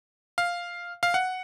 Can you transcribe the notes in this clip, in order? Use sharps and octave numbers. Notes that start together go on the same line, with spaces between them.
F5
F5
F#5